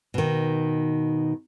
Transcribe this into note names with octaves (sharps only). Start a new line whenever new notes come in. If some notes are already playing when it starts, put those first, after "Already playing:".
B2 D#3